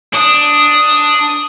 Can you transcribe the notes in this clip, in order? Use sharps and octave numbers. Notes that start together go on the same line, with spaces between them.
D4 D#6